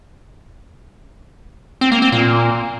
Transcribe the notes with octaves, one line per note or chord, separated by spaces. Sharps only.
C4
A#3
C4
A#2